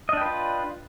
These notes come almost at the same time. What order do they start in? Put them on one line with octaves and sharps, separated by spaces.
D#5 D4 G5 B4 F4